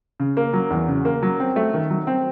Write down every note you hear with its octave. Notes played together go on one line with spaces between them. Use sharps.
C#3
A#3
F#3
E2
C#3
A#3
F#3
C4
A3
D#3
F#3
C4